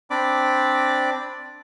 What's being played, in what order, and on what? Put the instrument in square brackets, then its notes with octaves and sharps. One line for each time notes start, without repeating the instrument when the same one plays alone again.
[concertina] C4 D4 D5 B5 D6